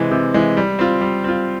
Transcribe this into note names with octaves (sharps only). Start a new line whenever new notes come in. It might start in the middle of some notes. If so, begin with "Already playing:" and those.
Already playing: C3 E3 G#3
C3
E3 G#3
G3
C4 F4
G3
C4 F4